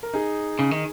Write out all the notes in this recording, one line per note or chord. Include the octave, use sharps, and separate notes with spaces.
A#4
D#4 G#4
C#3
D#3